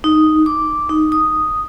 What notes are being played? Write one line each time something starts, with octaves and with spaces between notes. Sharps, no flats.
D#4
D6
D#4
D#6